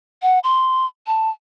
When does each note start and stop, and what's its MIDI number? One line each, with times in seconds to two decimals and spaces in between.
0.22 0.39 78
0.44 0.86 84
1.07 1.30 81